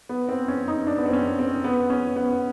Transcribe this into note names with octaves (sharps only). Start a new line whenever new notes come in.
B3
C4
C#4
D#4
D4
B3
C4
C#4
C4
B3
C#4
B3